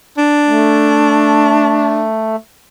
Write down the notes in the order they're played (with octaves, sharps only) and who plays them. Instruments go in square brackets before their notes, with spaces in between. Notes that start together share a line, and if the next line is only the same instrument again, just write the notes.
[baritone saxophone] D4
[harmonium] A3